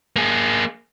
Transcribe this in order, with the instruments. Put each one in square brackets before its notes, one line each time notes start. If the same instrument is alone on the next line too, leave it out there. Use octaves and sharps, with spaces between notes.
[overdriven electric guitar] A#3 G#4